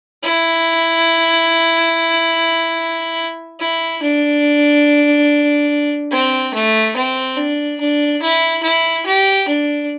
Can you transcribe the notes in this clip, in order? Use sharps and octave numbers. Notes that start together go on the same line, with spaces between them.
E4
E4
D4
C4
A3
C4
D4
D4
E4
E4
G4
D4